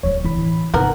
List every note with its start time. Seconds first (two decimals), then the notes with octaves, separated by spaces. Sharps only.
0.03 D1 D2 C#5
0.25 C#3 E3 B5
0.37 A2
0.74 G1 C3 D#3 B3 A#4 F#5 F#6